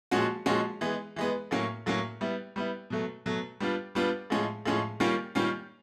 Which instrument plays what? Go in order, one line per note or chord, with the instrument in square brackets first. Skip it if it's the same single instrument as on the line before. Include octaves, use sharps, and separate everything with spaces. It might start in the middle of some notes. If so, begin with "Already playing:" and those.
[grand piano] A#2 F3 G#3 C#4 F#4
A#2 F3 G#3 C#4 F#4
E3 G#3 B3
E3 G#3 B3
A2 F#3 A#3 C#4
A2 F#3 A#3 C#4
G3 B3 E4
G3 B3 E4
B2 F#3 A3
B2 F#3 A3
G3 B3 D4 F4
G3 B3 D4 F4
A2 F3 G#3 C#4
A2 F3 G#3 C#4
D#3 G3 A#3 C#4 F4
D#3 G3 A#3 C#4 F4